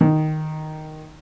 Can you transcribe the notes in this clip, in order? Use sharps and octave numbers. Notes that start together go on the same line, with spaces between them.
D#3